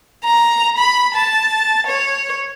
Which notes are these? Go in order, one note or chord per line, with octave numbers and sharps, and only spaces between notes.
A#5
B5
A5
C#5